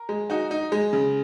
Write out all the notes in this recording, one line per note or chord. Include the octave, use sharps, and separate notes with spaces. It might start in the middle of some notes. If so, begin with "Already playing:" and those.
Already playing: A#4
G#3
D#4 F#4
D#4
G#3
C#3